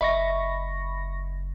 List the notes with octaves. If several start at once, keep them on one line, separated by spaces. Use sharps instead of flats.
F#1 D#5 E5 B5 C#6 A#6